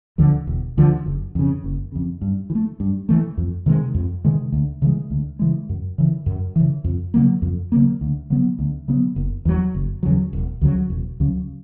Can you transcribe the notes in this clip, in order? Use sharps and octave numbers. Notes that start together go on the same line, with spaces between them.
D2 D3 F3
E1
D2 D3 F3
F#1
F2 C#3
F#1
F2 C#3
G2
E3
A3
G2
E3 A3
F2
C3 D#3 G#3
F2
C3 D#3 G#3
D2
C#3 E3 G#3
D2
C#3 E3 G#3
F#2
C#3 E3
F#2
C#3 E3
F2
C#3 F#3 A#3
F2
C#3 F#3 A#3
D2
C#3 F#3 B3
D2
C#3 F#3 B3
F#1
E2 C#3 F#3
F#1
E2 C#3 F#3
E1
D2 C#3 F#3
E1
D2 C#3 F#3